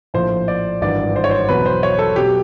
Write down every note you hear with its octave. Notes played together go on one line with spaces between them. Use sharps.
A#1 A2 F3 C5
D5
G#1 G2 E3 D5
C5
C#5
C5
E2 B2 F#3 B4
C5
C#5
A4
B2 F#3 G4